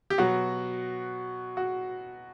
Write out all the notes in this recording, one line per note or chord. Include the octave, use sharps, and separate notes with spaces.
G4
B2 F#3 F#4
F#4